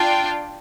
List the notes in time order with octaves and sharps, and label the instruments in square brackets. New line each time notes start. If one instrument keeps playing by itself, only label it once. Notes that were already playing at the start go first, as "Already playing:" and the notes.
Already playing: [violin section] D4 F4 G5